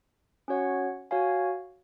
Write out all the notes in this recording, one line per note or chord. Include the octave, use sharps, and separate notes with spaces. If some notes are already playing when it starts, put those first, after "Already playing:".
C#4 F#4 C#5 F#5
F#4 C#5 F5 G#5